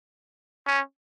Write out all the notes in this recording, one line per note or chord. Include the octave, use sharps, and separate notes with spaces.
C#4